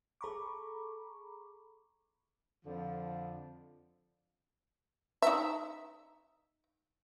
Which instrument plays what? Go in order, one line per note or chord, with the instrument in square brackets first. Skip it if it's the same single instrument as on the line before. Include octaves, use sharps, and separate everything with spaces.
[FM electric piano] G#4 A4 A#5 B5 C#6 D6
[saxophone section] F2 D3 F3
[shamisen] D#4 E5